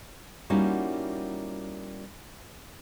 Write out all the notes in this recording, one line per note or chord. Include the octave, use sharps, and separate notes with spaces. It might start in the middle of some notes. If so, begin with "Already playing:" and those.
G3 A#3 C#4 D#4 E4 F#4